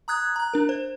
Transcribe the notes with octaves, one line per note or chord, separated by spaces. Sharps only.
A#5 D#6 F#6 G#6
A#5 F#6
D4 A#4
C5